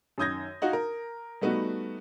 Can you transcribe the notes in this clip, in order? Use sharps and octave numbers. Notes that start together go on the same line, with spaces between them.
F#2 D#3 D#6 G6 G#6 A#6
D#4 F4 F#4 F#5
A#4
G3 A3 B3 D#4 F#4